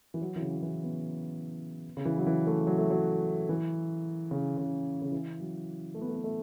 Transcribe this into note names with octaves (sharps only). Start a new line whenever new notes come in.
E3
F#3
E3
C#3
C#3
E3
B3
C#3
E3
F#3
E3
A3
F#3
A3
F#3
E3
C#3
C#3
C#3
E3
F#3
A3
B3
A3
B3
A3